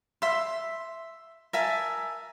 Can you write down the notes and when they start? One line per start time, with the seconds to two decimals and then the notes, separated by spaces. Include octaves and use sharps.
0.22 E5 C6
1.53 A#4 E5 G#5 A5